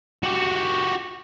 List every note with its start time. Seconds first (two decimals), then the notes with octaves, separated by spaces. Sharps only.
0.23 F#4 G4